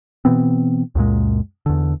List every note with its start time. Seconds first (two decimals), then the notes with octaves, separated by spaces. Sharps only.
0.25 B2 E3 B3 C4
0.95 C#2 F#2 A#2 G#3
1.66 E2 D3